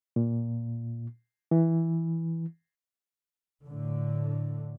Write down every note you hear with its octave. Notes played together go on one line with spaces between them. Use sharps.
A#2
E3
A2 D3